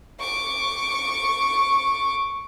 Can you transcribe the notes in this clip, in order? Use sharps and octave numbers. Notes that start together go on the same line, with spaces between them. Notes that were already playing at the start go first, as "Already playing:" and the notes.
C#6 D6